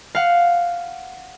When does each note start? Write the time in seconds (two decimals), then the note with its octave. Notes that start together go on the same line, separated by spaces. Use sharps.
0.15 F5 F#5